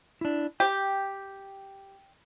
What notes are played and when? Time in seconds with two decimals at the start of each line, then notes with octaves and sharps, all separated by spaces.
0.21 D4 E4
0.60 G4 G5